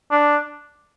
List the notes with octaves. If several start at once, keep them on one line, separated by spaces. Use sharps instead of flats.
D4